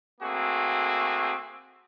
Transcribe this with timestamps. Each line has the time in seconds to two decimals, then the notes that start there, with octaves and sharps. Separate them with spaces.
0.21 A3 A#3 C4 F#4 G#4